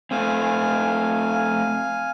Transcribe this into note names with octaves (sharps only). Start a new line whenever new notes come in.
A3 C4 F5 G#5